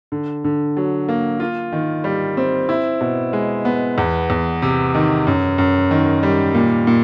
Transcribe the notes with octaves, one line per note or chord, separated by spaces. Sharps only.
D3
D3
F#3
A#3
F4
D#3
G3
C4
E4
B2
G#3
B3
E2
E2
C3
D#3
F#2
F#2
D#3
G3
A#2
A#2